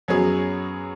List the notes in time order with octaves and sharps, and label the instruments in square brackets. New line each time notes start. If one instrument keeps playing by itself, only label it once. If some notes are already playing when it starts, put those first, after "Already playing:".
[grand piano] F#2 F#3 B3 G#4 C#5